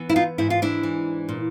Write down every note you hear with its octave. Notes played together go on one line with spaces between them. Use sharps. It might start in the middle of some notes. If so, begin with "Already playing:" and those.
Already playing: E3 B3
E4
D#4 F4
G#2 E4
F4
D4 E4
E3
A#2